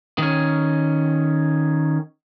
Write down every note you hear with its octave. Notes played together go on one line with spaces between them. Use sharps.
D#3 C#4